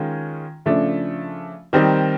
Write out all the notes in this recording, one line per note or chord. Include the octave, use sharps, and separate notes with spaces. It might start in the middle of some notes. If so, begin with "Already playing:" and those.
Already playing: D#3 G#3 C#4 F4
C#3 F3 A3 D4
D#3 G3 C4 D#4